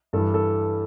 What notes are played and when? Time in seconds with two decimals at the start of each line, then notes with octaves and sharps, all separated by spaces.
0.13 G2 E3 G3 A4
0.34 A4